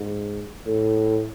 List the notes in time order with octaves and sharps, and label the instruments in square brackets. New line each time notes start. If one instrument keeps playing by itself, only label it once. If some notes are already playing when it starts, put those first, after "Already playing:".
Already playing: [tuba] G#2
A2